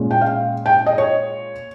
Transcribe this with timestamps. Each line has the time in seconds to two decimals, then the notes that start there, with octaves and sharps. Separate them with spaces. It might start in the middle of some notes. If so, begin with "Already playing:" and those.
Already playing: A#2 G#3 C#4
0.11 G5
0.21 F5
0.66 G5
0.86 D#5
0.98 C#5